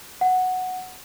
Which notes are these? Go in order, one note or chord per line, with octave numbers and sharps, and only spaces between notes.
F#5